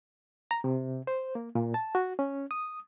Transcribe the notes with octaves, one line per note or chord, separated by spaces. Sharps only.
A#5
C3
C5
A#3
A#2
A5
F#4
C#4
D#6